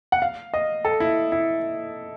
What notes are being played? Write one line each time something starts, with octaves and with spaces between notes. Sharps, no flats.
F#5
F5
D#5
A4
E4
E4